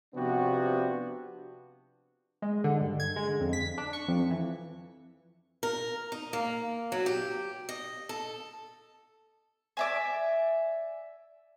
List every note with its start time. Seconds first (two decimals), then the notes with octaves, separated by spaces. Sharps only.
0.14 C3 F3 B3 D4 F#4 G4
2.42 G#3
2.64 D3
2.81 G2
3.00 G#6
3.16 G#3
3.28 D3
3.40 F2
3.53 B6
3.78 D4
3.93 C#6
4.08 F2
4.31 E3
5.63 A#4
6.12 D#4
6.33 A#3
6.92 F#3
7.06 G4
7.69 D#5
8.09 A4
9.77 D5 E5 G#5